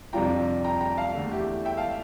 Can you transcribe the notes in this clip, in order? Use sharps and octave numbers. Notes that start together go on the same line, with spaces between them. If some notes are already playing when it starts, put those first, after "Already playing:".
F2 C3 G3 D4 F4 G5 A#5
G5 A#5
G5 A#5
F5 A5
E2 D3 A3
E4 G4
E5 G5
F5 A5